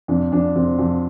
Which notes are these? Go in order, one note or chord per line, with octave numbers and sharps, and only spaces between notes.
F2 D4
F2 D4
F2 C4
F2